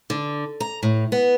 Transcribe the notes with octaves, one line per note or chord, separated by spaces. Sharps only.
D3
A#5
A2
B3